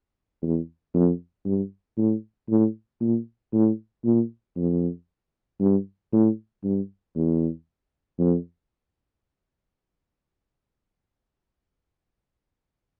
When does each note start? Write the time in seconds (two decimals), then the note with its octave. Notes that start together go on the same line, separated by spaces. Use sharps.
0.42 E2
0.94 F2
1.45 G2
1.97 A2
2.49 A2
3.01 A#2
3.53 A2
4.05 A#2
4.57 F2
5.60 G2
6.12 A2
6.64 G2
7.16 E2
8.19 F2